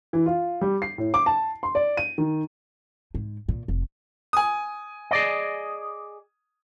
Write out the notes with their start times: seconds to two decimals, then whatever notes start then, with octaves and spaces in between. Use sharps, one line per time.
0.13 E3
0.26 F4
0.61 G3
0.82 C7
0.98 A2
1.14 D6
1.26 A5
1.63 C6
1.75 D5
1.97 D#7
2.18 D#3
3.15 G#2
3.49 A#2
3.68 F1
4.33 G#5 D#6
5.11 G#4 D5 D#5